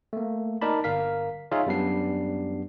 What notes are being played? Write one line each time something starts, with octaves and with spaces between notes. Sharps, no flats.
A3 A#3
D#4 A#4 D5 A5 B5
G1 A#4 F5 B6
D#4 F4 G#4 C#5 E5 F5
F#2 G3 B3 D4 C7